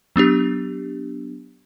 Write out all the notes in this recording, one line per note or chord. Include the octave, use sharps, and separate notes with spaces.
F#3 B3 D4 G4